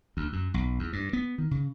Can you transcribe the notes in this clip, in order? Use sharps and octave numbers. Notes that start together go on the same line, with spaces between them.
D2
F#2
B1
E2
G2
B3
D#3
C#3